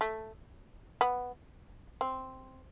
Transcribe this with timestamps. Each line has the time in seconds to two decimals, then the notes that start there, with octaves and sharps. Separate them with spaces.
0.01 A3
1.01 B3
2.01 C4